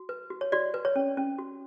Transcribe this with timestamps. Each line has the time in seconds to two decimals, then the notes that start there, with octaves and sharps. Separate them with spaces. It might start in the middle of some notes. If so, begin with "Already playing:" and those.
Already playing: F#4
0.09 B4
0.30 F#4
0.41 C#5
0.52 F#4 D5
0.74 B4
0.85 C#5
0.96 C#4
1.17 C#4
1.38 F#4